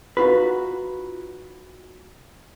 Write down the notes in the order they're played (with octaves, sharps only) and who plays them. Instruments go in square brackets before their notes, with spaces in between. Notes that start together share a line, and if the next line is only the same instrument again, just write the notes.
[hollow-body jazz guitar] D#4 F4 F#4 B4